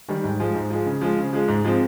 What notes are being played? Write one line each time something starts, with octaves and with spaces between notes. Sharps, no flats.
D#3 G3
G#2
F3 G#3
G#2
F3 G#3
C#3
F3 G#3
C#3
F3 G#3
G#2
F3 G#3 C4